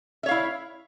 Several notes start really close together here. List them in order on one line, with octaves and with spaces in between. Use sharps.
E5 C#5 F5 E4